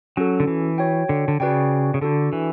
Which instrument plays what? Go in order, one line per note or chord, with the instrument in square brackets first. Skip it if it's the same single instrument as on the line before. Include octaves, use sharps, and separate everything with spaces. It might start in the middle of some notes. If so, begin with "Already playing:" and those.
[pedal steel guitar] F#3 [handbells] C#4 F#4 A4
[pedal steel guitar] D3
E3
[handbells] F#4 C#5 G5
[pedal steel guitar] D3
D3
[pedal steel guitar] C#3 [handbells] F#4 B4 D5 G5
[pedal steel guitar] C#3
[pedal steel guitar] D3 [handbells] D4 F#4 A4
[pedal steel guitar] E3